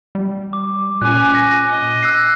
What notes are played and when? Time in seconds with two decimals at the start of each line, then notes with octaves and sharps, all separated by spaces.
0.15 G3
0.53 D6
1.01 A#2 C#4 G#5 D6 F#6
1.35 A#6
1.69 D#5
2.03 E6 F#6 C7